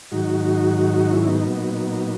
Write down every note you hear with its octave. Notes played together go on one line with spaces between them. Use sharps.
G#2 D#3 F#3 D#4 F#4
D#4 F#4
D#4 F#4
D#4 F#4
C#4 E4
B3 D#4
A#2 F#3